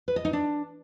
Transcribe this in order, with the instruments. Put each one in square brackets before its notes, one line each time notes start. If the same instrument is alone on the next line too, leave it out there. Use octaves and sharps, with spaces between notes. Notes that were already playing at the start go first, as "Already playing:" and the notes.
[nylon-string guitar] B4
D#5
D#4
D4